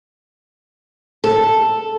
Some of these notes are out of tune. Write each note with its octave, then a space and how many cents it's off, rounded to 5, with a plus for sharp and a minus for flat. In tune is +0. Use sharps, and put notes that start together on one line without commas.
A4 +0